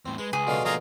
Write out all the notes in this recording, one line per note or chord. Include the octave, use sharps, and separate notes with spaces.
E2 A2 C4
G#3 B4
C#2 G#4
B2 D3 F#3 F4
F3 A#3 F4 G#4 A#5